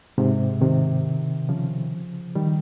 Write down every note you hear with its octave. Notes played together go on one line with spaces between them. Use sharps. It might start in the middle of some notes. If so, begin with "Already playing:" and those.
G#2 C3
C3 D#3
C#3 F3
D#3 G3